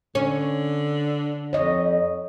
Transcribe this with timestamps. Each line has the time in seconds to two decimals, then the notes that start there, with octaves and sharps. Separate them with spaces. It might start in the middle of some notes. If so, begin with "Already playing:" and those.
0.15 D3 C#4
1.53 F2 C#5 D#5